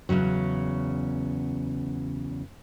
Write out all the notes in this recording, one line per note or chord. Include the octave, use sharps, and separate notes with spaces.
E2 A2 C#3 F#3